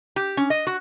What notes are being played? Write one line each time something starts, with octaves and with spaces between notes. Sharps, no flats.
G4
C#4
D#5
F#4